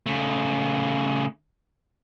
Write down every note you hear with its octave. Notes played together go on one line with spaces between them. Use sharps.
C#3 A3